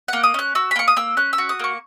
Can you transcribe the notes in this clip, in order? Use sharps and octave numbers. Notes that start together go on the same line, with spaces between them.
A#3 F#5
D#6
C#4 F#6
F#4 E6
B5
A#3 C#6
D#6
A#3 E6
C#4 F#6
E6
F#4
D#6
A#3 C#6